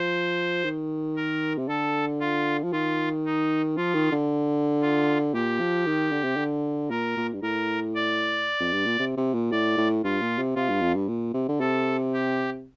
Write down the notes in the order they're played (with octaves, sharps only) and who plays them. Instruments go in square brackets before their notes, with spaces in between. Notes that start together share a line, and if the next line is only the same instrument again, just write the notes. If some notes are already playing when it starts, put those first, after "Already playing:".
Already playing: [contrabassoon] F3 [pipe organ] C5
[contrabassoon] D#3
[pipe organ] A#4
[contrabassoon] C3
[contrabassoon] D3 [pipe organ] A4
[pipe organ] F4
[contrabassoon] F3
[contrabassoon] D#3 [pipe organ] F4
[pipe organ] D#4
[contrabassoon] F3 [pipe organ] F4
[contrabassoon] D#3
D3
[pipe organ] F4
[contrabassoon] A#2 [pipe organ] G4
[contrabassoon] F3
D#3
D3
C3
D3
[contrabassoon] A#2 [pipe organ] A#4
[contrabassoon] A#2
G2
[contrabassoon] A2 [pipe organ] A#4
[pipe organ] D5
[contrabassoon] F2
G2
A#2
C3
C3
A#2
[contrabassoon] A2 [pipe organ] D5
[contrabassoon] A2
[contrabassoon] G2 [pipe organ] F4
[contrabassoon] A#2
C3
[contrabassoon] C3 [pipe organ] F4
[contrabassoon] G2
F2
G2
A#2
C3
D3
[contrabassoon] C3 [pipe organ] A4
[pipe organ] G4